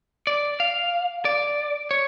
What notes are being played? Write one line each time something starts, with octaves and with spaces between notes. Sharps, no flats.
D5
F5
D5
C#5